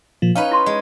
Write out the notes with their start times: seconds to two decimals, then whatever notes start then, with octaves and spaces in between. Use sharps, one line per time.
0.22 A#2 F3
0.35 C#4 D#4 B4 F5
0.51 E4 C6 C#6
0.66 G#3